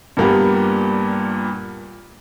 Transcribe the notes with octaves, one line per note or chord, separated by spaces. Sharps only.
G2 A#2 G3 A#3 B3 G4